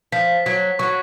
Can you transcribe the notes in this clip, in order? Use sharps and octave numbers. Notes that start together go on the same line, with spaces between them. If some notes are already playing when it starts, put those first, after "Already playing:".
F3 B6
F#3 B6
F#3 C#6